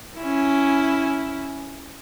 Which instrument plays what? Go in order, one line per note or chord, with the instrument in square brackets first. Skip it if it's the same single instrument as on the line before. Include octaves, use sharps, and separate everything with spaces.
[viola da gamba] C#4 E4